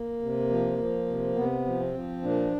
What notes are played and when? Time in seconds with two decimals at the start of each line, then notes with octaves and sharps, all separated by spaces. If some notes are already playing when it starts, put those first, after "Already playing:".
Already playing: A#3
0.21 C3
0.50 F3
0.78 F3
1.07 C3
1.36 C3 B3
1.66 F3
1.80 C4
1.94 F3
2.22 A#2 D4